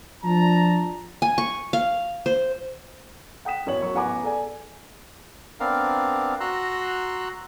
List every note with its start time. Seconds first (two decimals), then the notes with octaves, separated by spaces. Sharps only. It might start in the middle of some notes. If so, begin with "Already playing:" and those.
0.24 F3 D4 A5 A#5
1.22 G#5
1.38 C#6
1.73 F5
2.26 C5
3.45 F#5 G5 D#6 B6 E7
3.66 A1 F#2 B3 C#5 F#7
3.82 F#3 C#6
3.94 A1 B3 F#5 G#5 A#5 D6
4.23 G#4 A4 D5 G#5
5.60 B3 C4 D4 A#4 F5
6.40 F#4 A#5 C6 E6 F#6